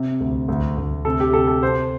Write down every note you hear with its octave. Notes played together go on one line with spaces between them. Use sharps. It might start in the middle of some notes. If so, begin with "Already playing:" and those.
Already playing: C3
D2
D2
D2
C3 A4
G4
C3 A4
A4
C3 C5